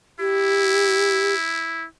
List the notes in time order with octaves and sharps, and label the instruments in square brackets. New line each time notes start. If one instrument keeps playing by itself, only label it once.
[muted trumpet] E4 [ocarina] G4